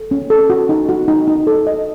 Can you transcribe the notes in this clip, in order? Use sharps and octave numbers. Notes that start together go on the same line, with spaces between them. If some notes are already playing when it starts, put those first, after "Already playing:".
Already playing: A4
C#4
A4
F#4
D#4
F#4
D#4
D#4
A4
D#5